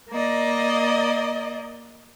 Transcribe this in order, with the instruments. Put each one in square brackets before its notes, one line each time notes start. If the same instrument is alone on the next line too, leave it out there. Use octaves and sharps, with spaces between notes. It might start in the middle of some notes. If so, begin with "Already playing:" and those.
[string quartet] A#3 D5 D#5